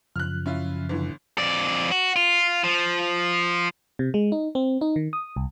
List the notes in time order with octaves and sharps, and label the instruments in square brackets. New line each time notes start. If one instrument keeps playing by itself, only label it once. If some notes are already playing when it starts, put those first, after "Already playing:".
[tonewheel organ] F#2 C#3 F3 [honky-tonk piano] F6 F#6
[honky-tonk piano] C#4 E4 F4
G1 D3 E3
[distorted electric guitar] F2 D5
F#4
F4
F3
[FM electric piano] C3
G#3
D#4
C4
D#4
D#3
D#6
C2